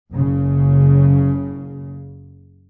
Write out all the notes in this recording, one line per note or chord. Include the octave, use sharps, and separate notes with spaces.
F#1 C#3